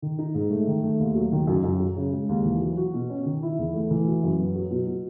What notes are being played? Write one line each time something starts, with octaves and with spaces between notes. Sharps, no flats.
D#3
D#4
G#2
A3
D#3
A3
D#2
F#3
D#3
F#2
F#2
F#3
C#3
G#3
D#2
E3
F#3
F#4
B2
C#4
D#3
E4
E2
A3
E3
F#4
F#2
B3
F#3
B2
B2